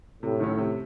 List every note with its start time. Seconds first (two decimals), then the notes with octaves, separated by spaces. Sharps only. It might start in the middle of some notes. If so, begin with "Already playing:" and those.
0.22 A2 C3
0.40 D#3 F#3 A3 C#4
0.58 C3